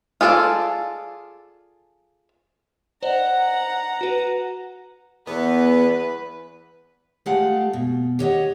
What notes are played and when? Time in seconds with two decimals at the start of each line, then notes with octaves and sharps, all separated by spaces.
0.21 F4 G#4 A4 C5 D5
3.03 C5 D5 D#5 F#5 A#5
4.01 F#4 B4
5.27 E2 B3 B4
7.26 G#3 A3 F4 G4 F5 F#5
7.73 B2
8.19 G4 C#5 D#5 F#5